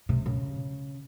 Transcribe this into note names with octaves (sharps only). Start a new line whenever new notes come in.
C3
C#3